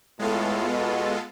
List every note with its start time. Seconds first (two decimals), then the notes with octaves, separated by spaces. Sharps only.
0.19 A2 G#3 B3 F4 A4
0.69 B2